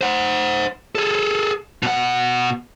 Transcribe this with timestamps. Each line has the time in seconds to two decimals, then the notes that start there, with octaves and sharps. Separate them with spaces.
0.01 C5 F#5
0.95 G#4 A4
1.83 B2 F#5